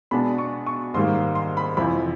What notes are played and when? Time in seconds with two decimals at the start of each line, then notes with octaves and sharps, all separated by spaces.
0.11 B2 G#3 B3 D4 B5
0.38 C#6
0.66 C#6
0.94 G#2 D#3 G3 A#3 C6
1.15 C6
1.35 C6
1.57 B5
1.77 F2 C3 E3 B5